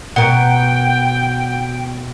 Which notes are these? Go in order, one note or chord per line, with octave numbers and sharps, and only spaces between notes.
B2 A#4 F#5 G5